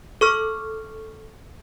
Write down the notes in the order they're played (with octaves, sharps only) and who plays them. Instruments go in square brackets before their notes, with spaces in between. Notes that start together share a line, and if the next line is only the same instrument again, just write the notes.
[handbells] A4 C#6 F6